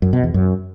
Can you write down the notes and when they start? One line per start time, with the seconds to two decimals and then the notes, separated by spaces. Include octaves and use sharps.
0.02 F#2
0.13 B2
0.24 E2
0.34 F#2